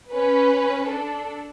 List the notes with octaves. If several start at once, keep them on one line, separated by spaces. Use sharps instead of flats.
C#4 B4
D4 A4